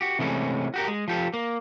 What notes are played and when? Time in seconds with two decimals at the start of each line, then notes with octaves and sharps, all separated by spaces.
0.01 F#4 G4
0.19 C3 E3 G#3 A3 C#4
0.74 F#4 G4 A#4
0.88 G#3
1.08 F3 G4 A4
1.34 A#3